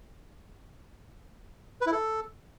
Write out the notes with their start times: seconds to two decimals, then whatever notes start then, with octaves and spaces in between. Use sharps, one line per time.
1.81 B4
1.87 E4
1.92 A4